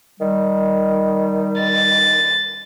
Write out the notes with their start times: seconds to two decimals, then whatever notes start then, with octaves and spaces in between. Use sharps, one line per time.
0.20 D#3 G3
1.60 A6